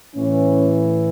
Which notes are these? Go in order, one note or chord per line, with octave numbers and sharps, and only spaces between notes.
A2 E3 C#4